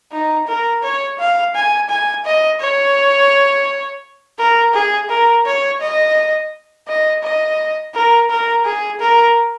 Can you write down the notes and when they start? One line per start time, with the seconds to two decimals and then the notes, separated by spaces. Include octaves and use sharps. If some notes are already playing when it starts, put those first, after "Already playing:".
0.12 D#4
0.48 A#4
0.83 C#5
1.19 F5
1.55 G#5
1.90 G#5
2.25 D#5
2.61 C#5
4.39 A#4
4.74 G#4
5.10 A#4
5.46 C#5
5.81 D#5
6.88 D#5
7.23 D#5
7.94 A#4
8.30 A#4
8.65 G#4
9.01 A#4